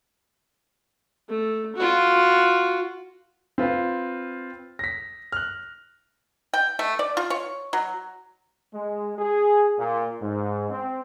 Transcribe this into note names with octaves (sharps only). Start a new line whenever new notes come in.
A3
F4 F#4
C4 F4 B4 F5
A#6 B6
F6 F#6
G5
A3
D5
F4
C#5
F#3
G#3
G#4
A#2
G#2
C4